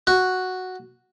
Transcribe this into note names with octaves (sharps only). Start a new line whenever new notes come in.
F#4